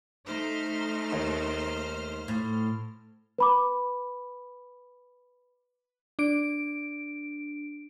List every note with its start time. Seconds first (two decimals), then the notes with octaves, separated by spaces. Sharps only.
0.26 A3 D#4 C5 F6
1.13 D#2
2.28 A2
3.38 B4 B5 D6
6.19 D4 D7